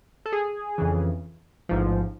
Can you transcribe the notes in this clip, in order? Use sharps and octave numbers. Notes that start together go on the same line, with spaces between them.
A4
G#4
F2 C#3 E3
A1 G#2 F3